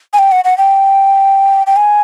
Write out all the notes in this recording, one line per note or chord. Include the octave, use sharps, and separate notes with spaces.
G#5
G5
F#5
F#5
G5
G5
G#5